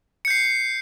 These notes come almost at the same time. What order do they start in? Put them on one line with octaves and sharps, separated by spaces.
C#7 G6 C7